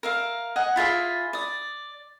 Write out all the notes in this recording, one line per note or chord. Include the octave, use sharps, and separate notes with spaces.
A#4 E5 F5
D#5 F#5 G#5
E4 F4 G#4 E5
D5 D#6